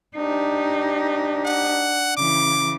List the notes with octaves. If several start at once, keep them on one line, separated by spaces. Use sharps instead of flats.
D4 D#4 G4
F#5
C#3 E3 D6